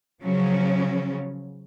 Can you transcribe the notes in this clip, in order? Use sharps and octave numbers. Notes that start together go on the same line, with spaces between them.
C#3 F3 F#3 C#4